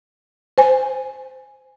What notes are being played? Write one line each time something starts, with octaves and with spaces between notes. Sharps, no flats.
C5 G#5